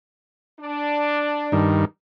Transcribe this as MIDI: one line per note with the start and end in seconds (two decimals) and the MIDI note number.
0.60 1.75 62
1.52 1.85 43
1.52 1.85 51